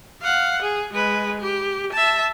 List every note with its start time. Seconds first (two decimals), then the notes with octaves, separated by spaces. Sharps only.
0.22 F5 F#5
0.62 G#4
0.93 G#3 B4
1.41 G4
1.93 E5 A5